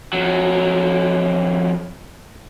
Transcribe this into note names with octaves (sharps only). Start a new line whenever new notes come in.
F2 F#3